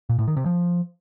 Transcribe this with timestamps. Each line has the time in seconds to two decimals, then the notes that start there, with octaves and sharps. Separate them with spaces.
0.09 A#2
0.19 A2
0.28 D#3
0.37 C3
0.46 F3